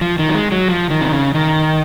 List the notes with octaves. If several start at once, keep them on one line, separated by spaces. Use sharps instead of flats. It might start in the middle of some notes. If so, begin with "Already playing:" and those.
F3
D#3
F#3
G#3
F#3
F3
D#3
C3
C#3
D#3